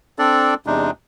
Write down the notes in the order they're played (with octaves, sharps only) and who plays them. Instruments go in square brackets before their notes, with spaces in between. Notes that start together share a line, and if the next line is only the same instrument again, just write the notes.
[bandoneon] C4 D4 A4 D5
E2 C3 G#3 D4 D#4